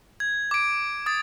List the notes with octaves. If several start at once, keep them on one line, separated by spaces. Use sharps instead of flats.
G#6
D6 D7
D#6 A6